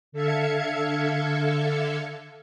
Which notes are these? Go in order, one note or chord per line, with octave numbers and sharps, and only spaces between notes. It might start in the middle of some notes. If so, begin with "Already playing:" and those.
D3 A4 E5 F5 G#6 C#7